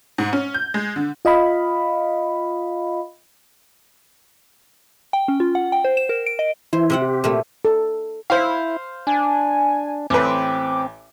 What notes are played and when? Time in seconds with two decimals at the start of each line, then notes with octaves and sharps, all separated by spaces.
0.18 G#2
0.33 C#4
0.54 G6
0.74 G#3
0.96 D3
1.25 F4 D#5 F5 B5
5.13 G5
5.28 C#4
5.40 F4
5.55 F#5
5.72 G5
5.85 C5
5.97 E7
6.09 A#4
6.26 D7
6.39 D#5
6.73 E3 E4 C5
6.90 C3 C4 F#5
7.02 G4
7.24 A#2 A3
7.65 A4
8.30 E4 C5 F5
9.07 D4 G#5
10.10 A1 C4 B4 D6